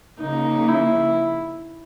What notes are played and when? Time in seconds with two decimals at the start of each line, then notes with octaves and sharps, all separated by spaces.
0.19 C#3 F3 A#3 D#4
0.68 E4